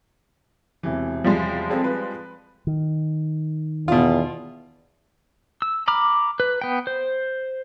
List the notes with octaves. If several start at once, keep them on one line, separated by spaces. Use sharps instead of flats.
E1 C3 E3
F3 G3 G#3
C4 G#4 A4
B4
D#3
E2 B2 F4
E6
A#5 B5 D6 F6
B4
B3 G5
C5